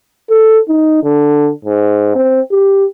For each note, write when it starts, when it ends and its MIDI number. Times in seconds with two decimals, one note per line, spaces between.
0.30 0.59 69
0.68 0.99 63
1.04 1.50 50
1.65 2.10 44
2.16 2.41 60
2.52 2.86 67